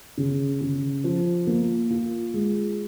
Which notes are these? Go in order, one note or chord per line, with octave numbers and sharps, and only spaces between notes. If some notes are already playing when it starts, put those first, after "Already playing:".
C#3
C#3
F3
A#3
F4
G#3